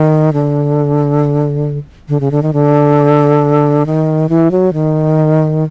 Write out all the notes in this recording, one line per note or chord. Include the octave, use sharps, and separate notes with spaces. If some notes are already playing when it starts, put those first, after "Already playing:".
Already playing: D#3
D3
D3
C#3
D3
D#3
D3
D#3
E3
F#3
D#3